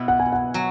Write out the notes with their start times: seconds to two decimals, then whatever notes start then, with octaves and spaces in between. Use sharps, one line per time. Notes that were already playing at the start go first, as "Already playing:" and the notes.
Already playing: B2 B3 E4 B4
0.08 F#5
0.20 G#5
0.33 F#5
0.54 F#3